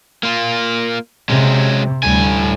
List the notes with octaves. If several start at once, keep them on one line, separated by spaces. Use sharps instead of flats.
A#3 F4
C3 F#3 G#3 C#4
D2 A2 G3 G#5